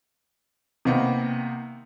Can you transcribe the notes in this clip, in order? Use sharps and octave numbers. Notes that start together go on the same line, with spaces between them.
C3 D#3 A#3 B3